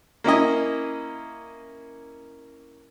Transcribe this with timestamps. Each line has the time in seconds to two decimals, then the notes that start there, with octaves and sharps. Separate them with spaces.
0.24 A#3 C#4 E4 D#5